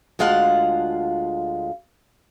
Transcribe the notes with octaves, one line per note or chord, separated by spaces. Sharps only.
D2 G#3 F4 F5 F#5 A5